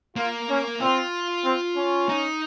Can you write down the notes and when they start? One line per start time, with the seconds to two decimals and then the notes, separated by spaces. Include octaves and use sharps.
0.16 A#3 F4
0.49 C#4
0.80 C4 F4
1.44 C4
1.77 C#4
2.09 D#4